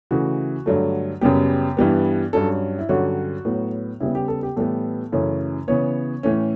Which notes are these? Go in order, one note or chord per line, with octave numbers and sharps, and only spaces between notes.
C#3 E3 A3 C#4 F#4
G2 D3 F#3 A3
F#2 C#3 G3 B3 G4
G2 E3 G3 B3
G2 F#3 C#4 A4
E4
G2 D3 F#3 C#4 F#4
A2 F#3 B3
C#3 G3 B3 E4
G4
A4
G4
A2 E3 G3 B3 A4
F#2 C#3 E3 A3 C#4
C#3 E3 B3 C#5
A2 E3 A3 C#4